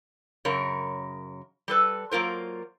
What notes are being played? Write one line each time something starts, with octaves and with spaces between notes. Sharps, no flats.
F#2 C#3 A#4 C#5
G3 A4 B4
F#3 A#3 F4 A#4 C5